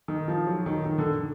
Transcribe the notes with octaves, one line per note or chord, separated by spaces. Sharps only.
D#3
F3
F#3
D#3
D#3
D3